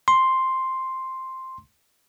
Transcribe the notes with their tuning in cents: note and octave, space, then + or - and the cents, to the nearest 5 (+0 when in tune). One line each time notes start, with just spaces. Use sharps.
C6 +0